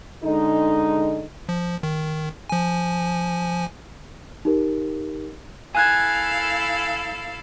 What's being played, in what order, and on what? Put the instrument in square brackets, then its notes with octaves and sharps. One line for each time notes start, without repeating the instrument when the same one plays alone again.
[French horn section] D3 G#3 D#4
[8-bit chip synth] F3
D#3
F3 G#5
[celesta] D#4 G4 A#4
[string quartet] E4 A4 F5 [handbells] G#5 F#6 G#6